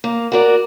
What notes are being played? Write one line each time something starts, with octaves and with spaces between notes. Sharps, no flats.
A#3
F#4 A#4 D5